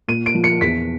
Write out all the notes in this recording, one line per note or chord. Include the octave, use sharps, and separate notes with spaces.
A#2 D#7
D7
F3
C#7
E2 B6